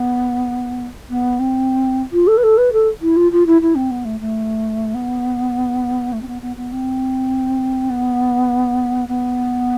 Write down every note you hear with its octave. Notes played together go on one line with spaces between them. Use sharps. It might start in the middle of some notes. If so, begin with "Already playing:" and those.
Already playing: B3
B3
C4
F4
A4
B4
A4
B4
A4
E4
F4
F4
E4
E4
C4
B3
A3
A3
B3
A3
C4
B3
B3
B3
C4
B3
B3